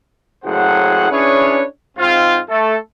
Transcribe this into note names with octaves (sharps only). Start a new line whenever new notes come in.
F#1 A2 F#3 G#4 C5 F#5
C#4 D4 E4 G#4 B4 C#5
G#2 C4 F4
A3 A4